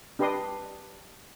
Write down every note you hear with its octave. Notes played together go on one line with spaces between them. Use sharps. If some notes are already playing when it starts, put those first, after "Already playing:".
D4 G4 B4 D#5 C6 D#6